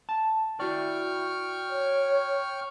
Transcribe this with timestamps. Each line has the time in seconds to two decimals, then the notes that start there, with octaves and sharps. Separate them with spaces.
0.09 A5
0.60 E4 F#4 D5 G5 C#6 F6
1.70 C#5